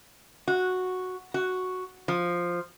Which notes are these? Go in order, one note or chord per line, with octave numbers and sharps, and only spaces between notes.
F#4
F#4
F3